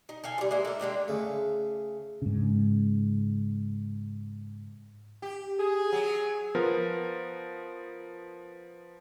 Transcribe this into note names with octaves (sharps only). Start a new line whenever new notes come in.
D#4
A4 F5 G#5
F3 G3
G#3 A#3 E4
A4 A#4
G#3 A#3 D4 G4
C#3 A3
G#2 C#3
G4
G#4
F#3
F3 B3 A#4